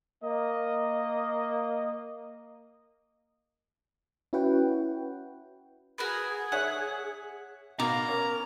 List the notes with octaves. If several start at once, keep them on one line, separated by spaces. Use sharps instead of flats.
A#3 D#5
C#4 E4 F#4 B4 F#5 G5
F#4 G#4 A#4 B4
C#5 E5 F#5 G#5
B2 A#3 F5 A#5
C#4 A#4